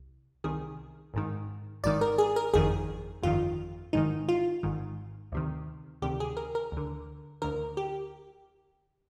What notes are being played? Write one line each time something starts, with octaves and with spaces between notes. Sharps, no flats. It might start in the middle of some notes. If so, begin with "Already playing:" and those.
Already playing: C2
C2 C3 D#3 G#4
G#1 G#2 D#3
G#1 G#2 D#3 D5
A#4
G#4
A#4
G1 F2 D#3 G#4
G1 F2 D#3 F4
G#1 G#2 D#3 D#4
F4
G#1 G#2 D#3
D2 C3 D#3
D2 C3 D#3 G4
G#4
A#4
A#4
D2 D3
D2 D3 A#4
G4